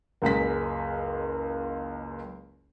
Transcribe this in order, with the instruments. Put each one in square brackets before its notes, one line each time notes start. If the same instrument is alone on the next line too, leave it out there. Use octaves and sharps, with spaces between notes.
[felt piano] F#1 C#2 G#3 B6